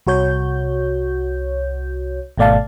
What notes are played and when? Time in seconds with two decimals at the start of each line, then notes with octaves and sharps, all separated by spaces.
0.07 C2 F#4 C#5 G6
2.38 G#1 B2 A3 D5 F5 A5